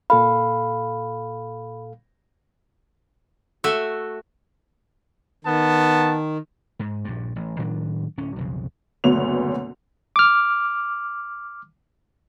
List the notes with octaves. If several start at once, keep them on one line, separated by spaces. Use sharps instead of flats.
A#2 A4 F5 B5
A3 F#4 E5
D#3 B3 A5
G#2
A#1 G2
A1
A2 D#3 F#3 D4
D1 C#4
B1 F2 C#3
F#1 D2 B2 B3 C#5 F7
D6 F6